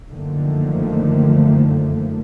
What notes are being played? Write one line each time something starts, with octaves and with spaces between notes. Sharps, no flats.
F#2 D3 D#3 F3 A3 A#3